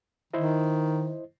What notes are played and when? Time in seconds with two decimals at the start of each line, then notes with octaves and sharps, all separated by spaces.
0.33 D#3 E4 C5 D#5